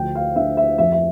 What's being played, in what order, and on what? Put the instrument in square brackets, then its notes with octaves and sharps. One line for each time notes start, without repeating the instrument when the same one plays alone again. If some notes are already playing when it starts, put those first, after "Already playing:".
Already playing: [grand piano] D2 F3 G5
F5
D3 E5
E5
F2 E5
E5